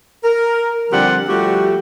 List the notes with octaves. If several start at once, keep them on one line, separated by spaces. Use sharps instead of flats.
A#4
D3 F3 G3 C4 G4 F#5
F3 G3 A3 F#4 G4